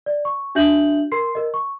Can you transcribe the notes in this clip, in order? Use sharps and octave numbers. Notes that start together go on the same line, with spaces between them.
D5
C#6
D4 F#4 E5 G6 F#7
A#4 C6 C7
A#4 D#5
C#6